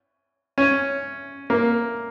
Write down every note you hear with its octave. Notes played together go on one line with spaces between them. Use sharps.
C#4
A#3